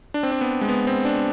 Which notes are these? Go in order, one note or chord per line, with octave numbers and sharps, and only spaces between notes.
D4
C4
D4
B3
G#3
B3
C4
D4